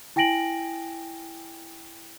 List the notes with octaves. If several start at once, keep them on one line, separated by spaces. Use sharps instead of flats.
E4 G5 G#5 A#6 D7 F#7